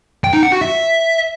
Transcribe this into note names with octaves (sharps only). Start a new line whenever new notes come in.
G5
D#4
F#5
F#4
E5